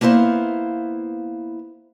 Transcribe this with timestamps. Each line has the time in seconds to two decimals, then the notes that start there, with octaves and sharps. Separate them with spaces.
0.01 A#3 B3 E4 C5 F5